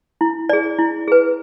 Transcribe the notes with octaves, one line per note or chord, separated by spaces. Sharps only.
E4
G#4 D5
E4
G#4 B4